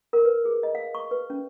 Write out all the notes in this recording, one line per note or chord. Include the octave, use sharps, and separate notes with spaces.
A#4
B4
G#4
D#5
F5
C#6
B4
C#4